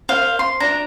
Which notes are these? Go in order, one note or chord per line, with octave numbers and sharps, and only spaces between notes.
C5 F5
C6
D4 A#5